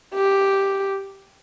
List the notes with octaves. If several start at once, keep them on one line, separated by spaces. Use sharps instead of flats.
G4